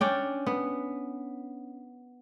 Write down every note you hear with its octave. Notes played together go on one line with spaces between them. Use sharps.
C#4 D4 G5
B3